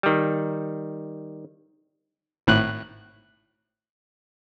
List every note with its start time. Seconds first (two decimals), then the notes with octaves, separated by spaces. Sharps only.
0.03 D#3 G3
2.47 G#1 A2 F#6